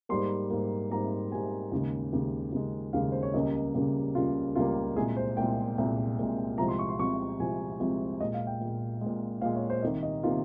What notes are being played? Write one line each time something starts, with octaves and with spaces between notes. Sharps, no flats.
G#2 G3 A#3 C6
G#2 G3 A#3
G#2 G3 A#3 A#5
G#2 G3 A#3 G#5
D#2 C#3 G#3
D#2 C#3 G#3
D#2 C#3 G#3
D#2 C#3 G#3 F5
C5
C#5
C#2 C#3 G3 A#3 D#5
C#2 C#3 G3 A#3
C#2 C#3 G3 A#3 F4
C#2 C#3 G3 A#3 F4
G4
C2 A#2 G#3 G#4
C5
C2 A#2 G#3 G5
C2 A#2 G#3
C2 A#2 G#3
C2 C3 F3 G#3 A#5
C6
C#6
C6
C2 C3 F3 G#3 C#6
C2 C3 F3 G#3 G#5
C2 C3 F3 G#3
A#2 G#3 D#5
F5
G5
A#2 G#3
G#3
A#2
A#2 G#3 F5
C#5
C5
C2 C3 D#3 A#3 D#5
D#5
C3 D#3 A#3 F4